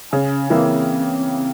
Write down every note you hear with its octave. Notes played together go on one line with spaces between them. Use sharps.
C#3 C#4
E3 A#3 C4 E4